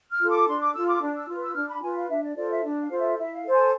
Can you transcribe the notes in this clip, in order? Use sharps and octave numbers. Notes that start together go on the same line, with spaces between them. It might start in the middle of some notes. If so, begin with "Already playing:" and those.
F6
F4 A4
D6
D4 C6
D6
F4 A4 E6
D6
D4
E6
F4 B4
E6
D4 F6
B5
F4 B4 G#5
F5
D4 E5
D5
F4 A4 C5 D5
E5
D4 D5
F5
F4 A4 C5
E5
E4 E5
F5
A4 C5
G#5